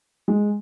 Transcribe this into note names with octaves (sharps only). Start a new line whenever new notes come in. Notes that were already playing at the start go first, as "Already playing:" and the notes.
G#3